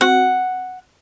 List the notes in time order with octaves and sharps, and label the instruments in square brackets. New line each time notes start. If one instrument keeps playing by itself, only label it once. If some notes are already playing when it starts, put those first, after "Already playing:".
[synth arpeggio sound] C4 F#4 [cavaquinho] F#5